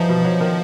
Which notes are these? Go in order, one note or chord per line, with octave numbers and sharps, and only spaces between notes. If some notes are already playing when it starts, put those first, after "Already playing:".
Already playing: G2 E3 F3 D#4
B2
F#3
D#3